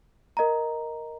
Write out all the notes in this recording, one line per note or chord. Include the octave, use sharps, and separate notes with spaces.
A#4 D#5 A#5